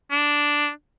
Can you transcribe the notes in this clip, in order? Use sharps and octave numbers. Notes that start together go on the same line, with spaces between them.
D4